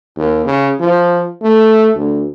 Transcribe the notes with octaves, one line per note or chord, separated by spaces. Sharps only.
D#2
C#3
F3
A3
D2